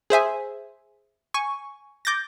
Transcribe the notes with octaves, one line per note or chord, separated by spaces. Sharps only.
G#4 C5 E5 G#5
G#5 C#6
D6 G6 A6 A#6